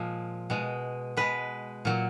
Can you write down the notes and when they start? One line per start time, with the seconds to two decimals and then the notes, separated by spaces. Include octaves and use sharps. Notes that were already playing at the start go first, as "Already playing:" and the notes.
Already playing: A#2 F3 G#3
0.50 B2 G#3
1.17 B2 G#3 B4
1.85 A#2 F#3